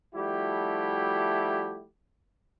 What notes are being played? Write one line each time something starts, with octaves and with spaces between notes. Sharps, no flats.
F3 G3 A3 E4 F#4 G4